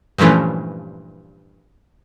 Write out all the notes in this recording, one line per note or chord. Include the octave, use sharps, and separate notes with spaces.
G2 A#2 E3 F3 A3 C#4